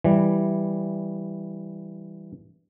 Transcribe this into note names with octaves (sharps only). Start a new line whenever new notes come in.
E3 G3